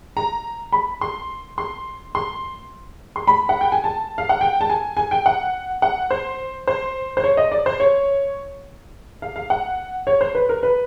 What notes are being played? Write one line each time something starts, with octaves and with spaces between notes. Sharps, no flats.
A#5
B5
C6
C6
C6
C6
B5
F#5
G5
G#5
A5
F5
F#5
G5
A5
G#5
G#5
G5
F#5
F#5
C5
C5
C5
C#5
D#5
D5
C5
C#5
F5
F5
F#5
C#5
C5
B4
A#4
B4